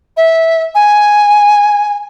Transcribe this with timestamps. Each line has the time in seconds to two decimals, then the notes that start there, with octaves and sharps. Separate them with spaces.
0.17 E5
0.75 G#5